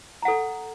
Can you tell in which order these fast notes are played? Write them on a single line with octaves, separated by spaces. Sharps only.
A#5 F#5 A4